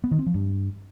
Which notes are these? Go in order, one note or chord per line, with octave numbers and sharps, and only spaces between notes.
B3
D#3
C4
F3
G2